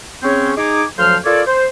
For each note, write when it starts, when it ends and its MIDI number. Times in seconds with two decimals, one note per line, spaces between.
0.23 0.51 49
0.23 0.51 60
0.23 0.51 61
0.23 0.51 72
0.23 0.51 73
0.56 0.84 63
0.56 0.84 68
0.56 0.84 86
0.98 1.17 38
0.98 1.17 53
0.98 1.17 54
0.98 1.17 72
0.98 1.17 77
0.98 1.17 89
1.25 1.42 65
1.25 1.42 69
1.25 1.42 70
1.25 1.42 73
1.25 1.42 74
1.47 1.67 72